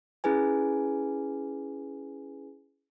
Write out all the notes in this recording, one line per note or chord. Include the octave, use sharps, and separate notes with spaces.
C#4 E4 G#4 B4 G#5